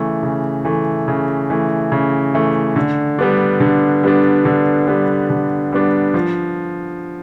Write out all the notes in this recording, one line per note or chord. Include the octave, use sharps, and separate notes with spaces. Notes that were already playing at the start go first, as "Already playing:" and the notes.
Already playing: C#3 E3 A3
C#3
E3 A3
C#3
E3 A3
C#3
E3 A3
D3
G3 B3 D4
D3
G3 B3 D4
D3
G3 B3 D4
D3
G3 B3 D4
F3